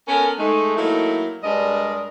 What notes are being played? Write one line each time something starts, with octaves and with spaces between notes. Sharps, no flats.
B3 C#4 A4 A#4
G#3 A3 D#4
F#3 A3 A#3 D#4 E4
G2 G#3 D4 A#4 D5 D#5